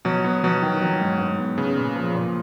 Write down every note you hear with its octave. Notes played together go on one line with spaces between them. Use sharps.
B2 F#3
B3
B2 F#3
D#3
F#3
G#2
G#2
B3
C#3 B3
A#2
F3
A#2